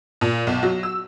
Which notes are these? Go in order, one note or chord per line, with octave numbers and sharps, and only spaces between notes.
A#2
B1
F#3
E6